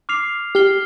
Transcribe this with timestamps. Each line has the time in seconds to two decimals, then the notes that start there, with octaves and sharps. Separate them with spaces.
0.09 D6 F6 C7 F7
0.55 G4 F6 C7 G7